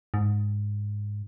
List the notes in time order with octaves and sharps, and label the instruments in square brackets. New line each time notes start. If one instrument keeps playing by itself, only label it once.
[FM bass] G#2